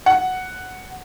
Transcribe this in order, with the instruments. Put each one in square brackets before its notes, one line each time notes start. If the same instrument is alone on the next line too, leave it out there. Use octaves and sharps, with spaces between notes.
[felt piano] F#5